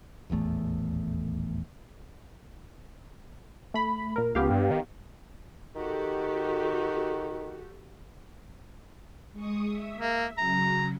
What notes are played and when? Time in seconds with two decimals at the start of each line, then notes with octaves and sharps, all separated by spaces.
0.30 D#1 A1 E2 A3
3.74 A3 B5
4.16 A#2 A#4
4.35 C#2 B3 G4 F5
4.50 G2
4.71 D#3
5.75 D#3 F#4 G4 A4
9.32 G#3 C#6 D#6
9.68 E5
9.99 A#3
10.38 C#3 F#3 A#5